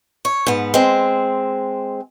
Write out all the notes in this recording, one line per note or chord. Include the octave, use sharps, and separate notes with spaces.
C#5
G#2 B3
G#3 C4